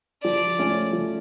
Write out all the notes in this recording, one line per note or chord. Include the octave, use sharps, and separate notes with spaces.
F3 D5
A3 C#4
F3